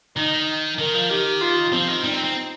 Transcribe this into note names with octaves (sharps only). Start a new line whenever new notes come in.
D#3 D#4
D#3 A#4
F3
D#3 G4
F4
F3 C4
D#3
G3 D#4
C4
C4